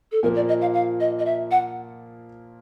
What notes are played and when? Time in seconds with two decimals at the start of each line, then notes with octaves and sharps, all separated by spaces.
0.12 A4
0.23 A#2 F3 A#3 A#4
0.36 D5
0.49 D#5
0.61 F5
0.74 F5
1.00 D#5
1.19 D#5
1.26 E5
1.51 F#5